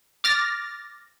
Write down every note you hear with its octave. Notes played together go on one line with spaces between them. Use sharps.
D6 F6 A6 A#6